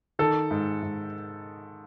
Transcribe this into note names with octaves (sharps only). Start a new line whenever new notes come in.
D#3 A4
G#2
G#2